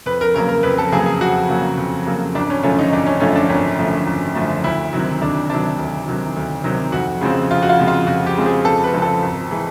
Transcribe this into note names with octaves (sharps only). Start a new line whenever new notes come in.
F2 B4
A#4
C#3 F#3 A#3 A#4
A#4
F2 B4
A4
C#3 F#3 A#3 G#4
G#4
F2 F#4
C#3 F#3 A#3
F2
C#3 F#3 A#3
G#1 D4
C#4
F#2 D3 F3 A3 C#4
D#4
G#1 D4
C#4
F#2 D3 F3 A3 C#4
D4
G#1 C#4
F#2 D3 F3 A3
G#1
F#2 D3 F3 A3
D2 E4
C3 D#3 F#3
D2 D4
C3 D#3 F#3 D4
D2
C3 D#3 F#3
D2
C3 D#3 F#3
F2 F#4
C#3 F3 G#3 C4
F2 F4
F#4
F4
C#3 F3 G#3 C4
F4
F2 F#4
G4
C#3 F3 G#3 C4
G#4
F2 A4
B4
C#3 F3 G#3 C4
A4
G#1
E3 G#3